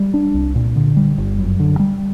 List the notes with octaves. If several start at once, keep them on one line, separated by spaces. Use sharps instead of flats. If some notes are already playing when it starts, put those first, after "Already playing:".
Already playing: G3
D4
C2
A#2
D3
G3
G1
F#2
D3
G3